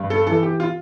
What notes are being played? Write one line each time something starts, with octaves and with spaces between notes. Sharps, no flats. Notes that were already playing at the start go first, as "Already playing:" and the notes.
Already playing: G2
A4
E3 A4
G4
F4